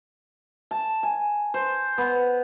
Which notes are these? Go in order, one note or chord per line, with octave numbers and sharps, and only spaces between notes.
A5
G#5
C5
B3